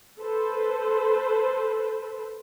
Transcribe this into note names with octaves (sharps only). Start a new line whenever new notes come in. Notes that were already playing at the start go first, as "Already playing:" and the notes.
A4 B4 C5